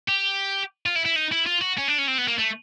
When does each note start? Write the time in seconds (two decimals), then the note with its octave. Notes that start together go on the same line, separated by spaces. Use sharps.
0.09 G4
0.86 F4
0.95 E4
1.05 E4
1.16 D#4
1.32 E4
1.46 F4
1.61 F#4
1.78 C#4
1.88 D4
1.98 C#4
2.08 C4
2.18 B3
2.28 A#3
2.39 A3